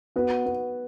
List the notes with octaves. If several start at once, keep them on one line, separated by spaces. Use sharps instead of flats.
B3 F#4
B3